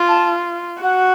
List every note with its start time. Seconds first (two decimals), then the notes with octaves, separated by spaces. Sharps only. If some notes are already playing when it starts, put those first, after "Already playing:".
Already playing: F4
0.08 A5
0.82 F#4 F#5